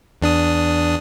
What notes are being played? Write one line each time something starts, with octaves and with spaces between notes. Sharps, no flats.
E2 D4 D#6